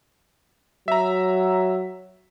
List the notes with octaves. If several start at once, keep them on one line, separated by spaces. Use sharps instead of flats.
F#3 E5 A#5